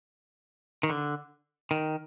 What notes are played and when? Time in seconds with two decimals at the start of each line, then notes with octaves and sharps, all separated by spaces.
0.83 D#3
0.90 D3
1.71 D#3